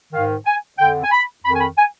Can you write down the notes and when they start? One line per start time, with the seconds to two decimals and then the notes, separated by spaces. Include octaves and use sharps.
0.13 G#2 D#3 F5
0.45 G#5
0.78 F2 D3 G5
1.04 G#5
1.12 B5
1.44 F2 B5
1.48 D#3
1.54 G#5
1.61 B5
1.78 G#5